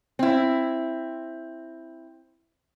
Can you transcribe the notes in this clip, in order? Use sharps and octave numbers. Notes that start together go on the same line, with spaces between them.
C4 E4